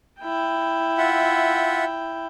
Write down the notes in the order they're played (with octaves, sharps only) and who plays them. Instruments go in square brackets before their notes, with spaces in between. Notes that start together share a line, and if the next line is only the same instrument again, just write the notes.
[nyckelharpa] E4 G5
[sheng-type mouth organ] F4 E5 F#5